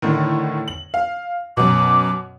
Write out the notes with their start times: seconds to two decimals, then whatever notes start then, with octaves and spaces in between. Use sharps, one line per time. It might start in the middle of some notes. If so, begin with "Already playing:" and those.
0.02 A2 D3 D#3
0.68 F#7
0.94 F5
1.57 F#2 B2 D6